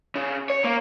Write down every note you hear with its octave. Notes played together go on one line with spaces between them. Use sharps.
C#3
C#5
A#3